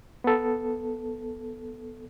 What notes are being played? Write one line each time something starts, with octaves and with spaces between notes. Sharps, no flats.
B3 A4